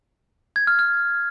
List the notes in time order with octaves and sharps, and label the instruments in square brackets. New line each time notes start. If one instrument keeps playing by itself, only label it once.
[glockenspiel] G#6
F6
F6